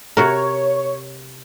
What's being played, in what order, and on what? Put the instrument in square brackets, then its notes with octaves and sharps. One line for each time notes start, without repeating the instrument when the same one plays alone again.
[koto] C3 F#4 A#4 [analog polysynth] C#5